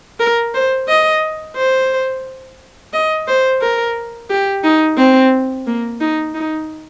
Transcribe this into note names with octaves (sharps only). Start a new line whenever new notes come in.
A#4
C5
D#5
C5
D#5
C5
A#4
G4
D#4
C4
A#3
D#4
D#4